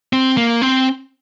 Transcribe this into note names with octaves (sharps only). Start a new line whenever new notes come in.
C4
A#3
C4